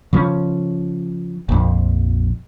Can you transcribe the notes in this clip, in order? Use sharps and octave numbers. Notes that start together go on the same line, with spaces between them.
C#3 F3 C4 C#4
A#1 F2